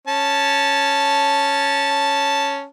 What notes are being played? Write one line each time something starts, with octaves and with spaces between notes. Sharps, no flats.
C#4 A5